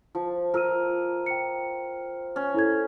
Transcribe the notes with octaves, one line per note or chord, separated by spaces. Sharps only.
F3
F4 A#4 E6 D#7
G5 C#7
C#4
E4 A4 G#6